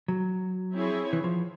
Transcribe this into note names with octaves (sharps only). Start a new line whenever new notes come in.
F#3
C4 E4 G#4 C#5
E3
F3